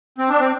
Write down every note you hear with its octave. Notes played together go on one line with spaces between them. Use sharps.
C4
D4
C4